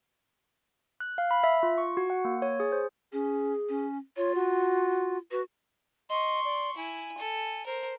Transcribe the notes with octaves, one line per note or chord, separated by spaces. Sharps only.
F#6
F5
B5
E5
F4
C#6
F#4
F#5
A#3
C#5
G#4
C5
C#4 G#4
C#4
F4 C#5
F#4
F#4 B4
D#5 C6 C#6
D5
E4 G#5
A4
A#4 C5